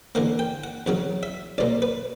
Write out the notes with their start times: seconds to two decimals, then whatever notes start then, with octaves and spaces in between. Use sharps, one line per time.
0.15 E2 D3 A#3 F#5
0.39 G5
0.64 F#5
0.86 E2 C#3 F#3 F#5
1.23 E5
1.58 B1 B2 A#3 D5
1.82 B4